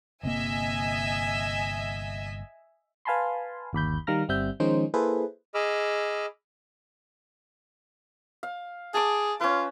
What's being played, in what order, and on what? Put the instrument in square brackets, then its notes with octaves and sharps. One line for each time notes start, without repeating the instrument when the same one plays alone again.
[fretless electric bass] G1 C3 A#3 [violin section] D#5 E5 G#5
[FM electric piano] B4 F5 G#5 A5 B5 C6
G1 D#2 B5 G6
D#3 G3 F5 A#5 F6 A#6
G1 G3 C4 E5 G6
D#3 F3 G#3 C#4 D#4 C5
A#3 E4 G#4 A4 B4 C5
[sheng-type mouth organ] G#4 D#5 B5 D6 E6 F6
[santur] F5
[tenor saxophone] G#4 [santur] A5 D6
[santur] C#4 B4 [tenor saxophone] F4